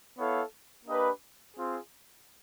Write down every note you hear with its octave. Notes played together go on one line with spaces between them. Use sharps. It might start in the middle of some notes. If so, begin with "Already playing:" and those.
B3 E4 A4 C#5 F5
A#3 D4 G4 B4 D#5
C4 F4 G#4